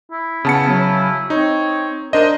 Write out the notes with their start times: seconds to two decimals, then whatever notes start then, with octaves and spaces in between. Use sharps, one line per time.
0.12 E4
0.45 C#3 B3 A5 C#7
0.68 F#3
1.30 C4 D#4 C#5
2.13 D4 A#4 C5 D#5